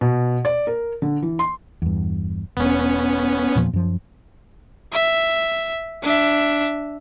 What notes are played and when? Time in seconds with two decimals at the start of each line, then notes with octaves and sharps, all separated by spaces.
0.01 B2
0.45 D5
0.67 A#4
1.02 D3
1.22 E3
1.39 C6
1.82 E2 G2
2.57 E1 B3 C#4
3.55 E2 A#2 F3
3.73 F#2 F3
4.92 E5
6.03 D4 E5